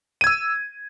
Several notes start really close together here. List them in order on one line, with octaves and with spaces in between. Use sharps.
D#7 G#6 E6